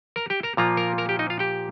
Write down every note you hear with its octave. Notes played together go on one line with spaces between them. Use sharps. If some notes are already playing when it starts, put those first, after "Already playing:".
A#4 A#5
G4 G5
A#4 A#5
A#2 F3 A#3 F4 A#5
A#4 A#5
A#4 A#5
G4 G5
D#4 D#5
F4 F5
G4 G5